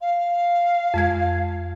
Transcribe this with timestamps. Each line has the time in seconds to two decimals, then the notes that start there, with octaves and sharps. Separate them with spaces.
0.01 F5
0.94 F2 G#3 G#6